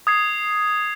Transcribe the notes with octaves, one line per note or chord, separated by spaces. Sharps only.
D#6 G#6 C7